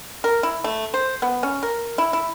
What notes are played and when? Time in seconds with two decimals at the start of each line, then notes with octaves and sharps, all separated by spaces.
0.24 A#4
0.43 E4
0.64 A3
0.94 C5
1.22 B3
1.43 C#4
1.63 A#4
1.98 E4
2.13 E4